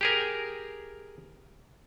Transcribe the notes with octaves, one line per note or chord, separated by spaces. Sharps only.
G4 G#4 A#4